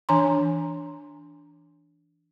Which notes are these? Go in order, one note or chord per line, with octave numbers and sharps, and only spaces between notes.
E3 D4 C#5 G#5 A#5 C6